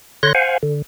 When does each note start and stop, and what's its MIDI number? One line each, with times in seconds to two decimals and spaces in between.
0.23 0.33 50
0.23 0.33 73
0.23 0.33 84
0.23 0.33 90
0.23 0.33 94
0.35 0.58 72
0.35 0.58 77
0.35 0.58 78
0.35 0.58 80
0.63 0.82 50